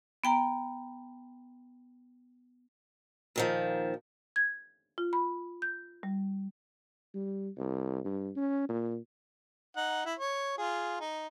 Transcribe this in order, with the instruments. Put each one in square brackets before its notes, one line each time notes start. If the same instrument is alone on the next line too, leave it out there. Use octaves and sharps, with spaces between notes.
[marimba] B3 G5 A#5
[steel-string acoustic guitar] A#2 D#3 F3
[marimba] G#6
F4
B5
G6
G3
[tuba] G3
C2
G2
C#4
A#2
[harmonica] D#4 F#5
E4
C#5
F4 G#4
D#4